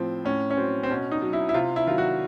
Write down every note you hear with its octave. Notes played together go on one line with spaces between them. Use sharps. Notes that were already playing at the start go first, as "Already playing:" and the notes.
Already playing: A2 F3 C4
A2 C#4
C#4
F#3 C4
C4
B2 C#4
D#4
F#3
E4
E4
C3 F4
E4
D#3 F#3 F4
F#4